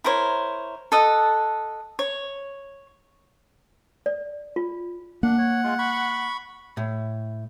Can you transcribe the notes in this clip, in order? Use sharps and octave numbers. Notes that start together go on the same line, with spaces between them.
E4 A#4 C5 C#5
A4 D#5 F#5
C#5
D5
F4
A#3 D4 F#5
C#5
G#3 F4
B5 C#6
A2